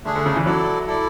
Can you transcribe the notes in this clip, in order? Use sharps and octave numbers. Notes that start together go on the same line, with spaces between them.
D3 A3 D4 G#4
D3
C#3
E3
F#3 E4 A4 D5
E4 A4 D5